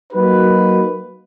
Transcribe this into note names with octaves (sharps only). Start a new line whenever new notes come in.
F#3 A#3 D#4 F#4 B4